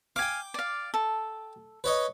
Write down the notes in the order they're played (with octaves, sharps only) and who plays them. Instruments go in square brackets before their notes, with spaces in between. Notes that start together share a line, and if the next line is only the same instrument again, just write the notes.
[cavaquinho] F5 G#5 [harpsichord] G5 D6
[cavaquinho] D5 F5
A4
[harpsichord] B4 C#5 D#5